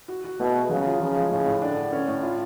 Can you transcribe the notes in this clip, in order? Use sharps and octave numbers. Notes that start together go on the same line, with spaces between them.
F#4
F#4
B2 A3
G#4
C#3 F#3
F4
C#3 F3
G#3
A2 C#3
A2
D3 D4
D4
C#4
A2
F4